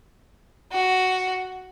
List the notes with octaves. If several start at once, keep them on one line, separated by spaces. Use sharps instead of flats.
F#4